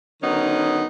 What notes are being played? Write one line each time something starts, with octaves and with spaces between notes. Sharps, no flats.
D3 D#3 F#3 B3 C#4 D#4